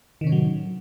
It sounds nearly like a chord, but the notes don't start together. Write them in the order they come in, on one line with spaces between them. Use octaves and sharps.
D#3 C3 C#4 A2 F#3